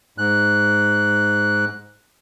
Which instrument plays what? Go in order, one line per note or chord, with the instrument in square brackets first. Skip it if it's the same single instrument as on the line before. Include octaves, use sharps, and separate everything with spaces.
[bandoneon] G#2 F#6